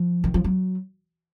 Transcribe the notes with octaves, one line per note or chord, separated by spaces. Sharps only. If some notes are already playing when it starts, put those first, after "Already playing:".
Already playing: F3
D#3
F3
F#3